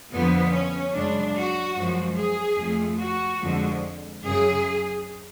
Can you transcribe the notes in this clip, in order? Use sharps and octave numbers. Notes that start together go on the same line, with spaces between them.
F2 D3 F3 B3
C#4
F#2 C#3 G#3 D4
F#4
F#2 F3 G#3
G#4
F2 F3 A3
F#4
F2 D3 F3 G#3
F#2 C#3 F#3 G#4